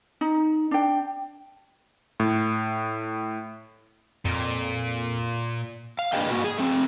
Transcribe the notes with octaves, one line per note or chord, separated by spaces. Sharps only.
D#4
D4 G5
A2
F2 A#2
F5
A#3 D4 G#4 B4 D#5 G5
A#3 F#4
G#4
A3 C4